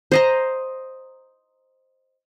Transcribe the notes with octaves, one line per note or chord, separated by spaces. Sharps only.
C5 D#5 A#5